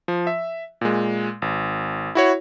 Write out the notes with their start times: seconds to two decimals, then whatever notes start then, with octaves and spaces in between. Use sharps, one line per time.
0.08 F3
0.27 E5
0.81 A#2 G#3
1.42 G#1
2.15 E4 F#4 C#5